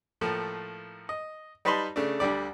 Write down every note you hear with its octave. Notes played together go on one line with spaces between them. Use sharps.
A2 F3 A3 A#3
D#5
G3 D#4 B4 A5 B5 C6
C#3 A3 D4
D2 D3 G3 D5